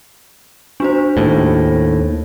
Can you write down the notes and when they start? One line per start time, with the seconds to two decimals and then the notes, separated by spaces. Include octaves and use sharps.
0.80 D4 F#4 C5
1.17 D#2 A2